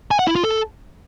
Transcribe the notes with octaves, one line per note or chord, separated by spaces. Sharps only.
G#5
F#5
E4
F4
A4